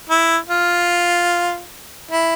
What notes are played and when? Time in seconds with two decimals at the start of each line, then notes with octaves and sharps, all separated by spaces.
0.09 E4
0.49 F4
2.11 E4